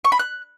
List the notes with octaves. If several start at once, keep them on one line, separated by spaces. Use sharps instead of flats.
C#6
B5
F#6